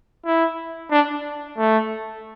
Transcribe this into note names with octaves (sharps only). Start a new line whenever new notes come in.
E4
D4
A3